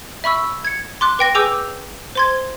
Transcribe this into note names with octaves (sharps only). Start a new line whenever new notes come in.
E5 B5 C#6 E6
G#6 C#7
C6 D6 F#6
B4 G5 A#6
G#4 B4 G#5 D6 E6 G6
C5 C6 G#6